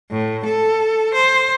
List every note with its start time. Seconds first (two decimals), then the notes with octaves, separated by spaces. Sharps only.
0.11 A2
0.45 A4
1.14 C5